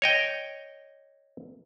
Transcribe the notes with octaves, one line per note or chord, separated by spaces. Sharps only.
C#5 D#5 G5